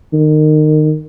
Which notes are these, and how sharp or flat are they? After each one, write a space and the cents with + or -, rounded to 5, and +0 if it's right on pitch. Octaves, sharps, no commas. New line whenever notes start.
D#3 -25